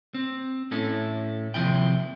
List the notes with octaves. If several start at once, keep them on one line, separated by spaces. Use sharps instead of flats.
C4
A2 C#4 E4 A4
D#2 C3 F3 E4 G5